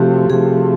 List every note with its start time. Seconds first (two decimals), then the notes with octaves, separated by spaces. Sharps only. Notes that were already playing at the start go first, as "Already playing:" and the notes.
Already playing: C3 F3 A3 F#4 G4
0.30 C3 F3 A3 G#4